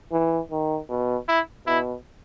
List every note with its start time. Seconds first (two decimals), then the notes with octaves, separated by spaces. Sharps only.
0.12 E3
0.51 D#3
0.89 B2
1.28 E4
1.67 B2 E4